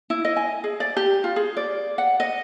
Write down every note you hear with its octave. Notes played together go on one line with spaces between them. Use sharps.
E4
D#5
G#5
G#4
D5
G4
F4
G#4
D5
F#5
D#5